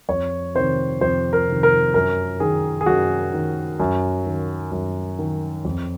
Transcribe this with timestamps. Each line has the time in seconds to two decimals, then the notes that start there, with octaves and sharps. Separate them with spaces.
0.09 F2 C#5
0.55 C3 D#3 C5
1.01 F2 C5
1.33 A#4
1.48 C3 D#3
1.63 A#4
1.94 F#2 A#4
2.40 D#3 G#4
2.81 G#4
2.86 F#2 F#4
3.33 D#3
3.80 F#2
4.26 D#3
4.72 F#2
5.19 D#3
5.65 F2